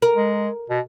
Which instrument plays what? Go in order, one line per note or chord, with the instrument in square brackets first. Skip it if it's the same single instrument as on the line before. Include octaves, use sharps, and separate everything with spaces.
[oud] A#4
[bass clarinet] G#3
B2